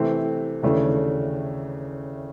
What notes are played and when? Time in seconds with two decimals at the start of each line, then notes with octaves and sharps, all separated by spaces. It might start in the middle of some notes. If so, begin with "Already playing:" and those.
Already playing: C3 E3 A3 C4
0.63 D#2 C#3 E3 A3 D4